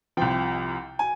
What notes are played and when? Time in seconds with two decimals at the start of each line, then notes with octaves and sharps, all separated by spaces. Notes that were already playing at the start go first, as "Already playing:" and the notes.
0.17 C2 C3 F3 G5
0.99 G#5